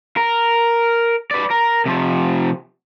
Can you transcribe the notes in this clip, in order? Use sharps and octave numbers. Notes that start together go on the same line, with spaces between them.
A#4
B4 D5
A#4
C3 F3